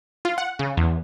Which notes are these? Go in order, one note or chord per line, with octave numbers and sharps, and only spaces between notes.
F4
F#5
C#3
E2